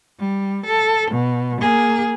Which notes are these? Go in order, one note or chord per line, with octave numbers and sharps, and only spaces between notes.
G3
A4
B2
A#3 G#4